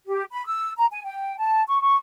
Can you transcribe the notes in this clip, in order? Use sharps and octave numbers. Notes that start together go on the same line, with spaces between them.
G4
B5
E6
A#5
G#5
G5
A5
C#6
C#6